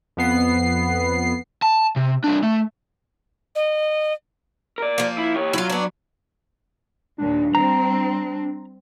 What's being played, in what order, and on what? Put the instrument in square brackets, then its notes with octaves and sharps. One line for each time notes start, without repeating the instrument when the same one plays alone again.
[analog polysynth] F2 B3 C7
[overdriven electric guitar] A5
C3
C2 D4
A3
[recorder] D#5
[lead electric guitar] A#4 D5
[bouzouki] F3 A#3
[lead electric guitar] E4
G4 C#5
[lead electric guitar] F#3 [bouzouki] E4 F4
[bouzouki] B3 D4
[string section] D#2 A#2 [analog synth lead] D4
[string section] G3 C4 [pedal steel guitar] A#5